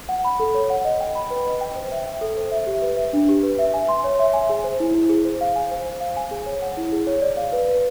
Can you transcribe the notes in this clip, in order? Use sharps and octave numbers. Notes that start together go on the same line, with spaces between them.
F#5
B5
A4
C#5
F#5
D#5
G5
B5
B4
D#5
G5
C5
E5
G5
A4
C5
E5
G4
B4
E5
D4
G4
B4
E5
G#5
C6
C#5
E5
G#5
G#4
C5
E4
E4
G#4
C5
F5
G#5
C5
C5
F5
G#5
G#4
C#5
F#5
E4
G#4
C#5
D5
F5
B4
B4